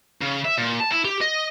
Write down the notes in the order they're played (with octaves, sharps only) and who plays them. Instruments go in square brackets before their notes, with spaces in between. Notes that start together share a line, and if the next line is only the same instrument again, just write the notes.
[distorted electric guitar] C#3
E5
A#2
A5
E4
G4
D#5